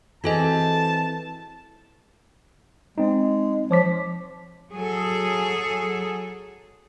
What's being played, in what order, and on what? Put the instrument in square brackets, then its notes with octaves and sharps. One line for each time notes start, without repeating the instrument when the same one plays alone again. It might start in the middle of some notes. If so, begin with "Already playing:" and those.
[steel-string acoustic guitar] E3 C4 G#4 [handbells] F#4 A4 D#5 [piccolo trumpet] A5
[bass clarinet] G#3 [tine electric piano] C4 D#4
[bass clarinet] F3 [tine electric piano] C#5 D6 B6
[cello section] F#3 G#4 A4